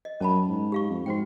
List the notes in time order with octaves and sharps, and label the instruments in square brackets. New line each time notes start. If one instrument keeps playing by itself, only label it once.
[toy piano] D#5
[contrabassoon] F#2 [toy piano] C#4 A5 B5
[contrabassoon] G#2
[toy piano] G4 F5 C#6
[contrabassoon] F2
[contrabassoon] G#2 [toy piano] F#4 C5 G5